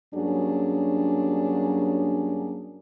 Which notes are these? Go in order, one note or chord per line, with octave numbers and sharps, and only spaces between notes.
G2 F#3 A#3 C#4 D4 G#4